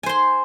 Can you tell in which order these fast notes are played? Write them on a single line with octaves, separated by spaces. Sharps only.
G#5 C5 C6